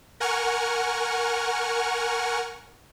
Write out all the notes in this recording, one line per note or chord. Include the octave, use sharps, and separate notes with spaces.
A#4 F#5 G#5 C#6 F6